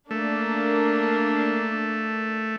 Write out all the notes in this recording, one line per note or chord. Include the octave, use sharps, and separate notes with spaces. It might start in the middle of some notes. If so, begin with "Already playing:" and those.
A3 A#3 D4